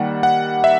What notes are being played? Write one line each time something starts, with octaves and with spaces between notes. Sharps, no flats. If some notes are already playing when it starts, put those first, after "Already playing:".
Already playing: D#3 G3 A#3 F#5
F#5
E5